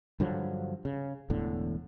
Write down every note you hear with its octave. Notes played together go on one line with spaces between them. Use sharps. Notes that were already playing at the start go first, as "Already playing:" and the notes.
G2 D3 F3 F#3
C#3
E1 E2 A2 D3